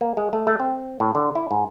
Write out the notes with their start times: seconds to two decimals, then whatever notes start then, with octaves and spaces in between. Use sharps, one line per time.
0.01 A#3
0.17 G#3
0.33 A3
0.47 A3
0.60 C4
1.00 A2
1.15 D3
1.35 E4
1.51 G#2